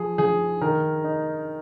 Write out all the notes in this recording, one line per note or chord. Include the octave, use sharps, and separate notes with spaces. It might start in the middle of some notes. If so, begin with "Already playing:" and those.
Already playing: F3 G#4
F3 G#4
D#3 A#4
D#4